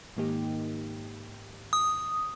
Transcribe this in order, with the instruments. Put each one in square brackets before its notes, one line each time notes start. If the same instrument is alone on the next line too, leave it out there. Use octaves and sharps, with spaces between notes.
[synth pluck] G#2 D#3 A#3 D#4 G4
[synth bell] D#6